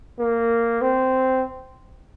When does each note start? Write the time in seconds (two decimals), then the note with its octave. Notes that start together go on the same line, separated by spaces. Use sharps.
0.19 A#3
0.81 C4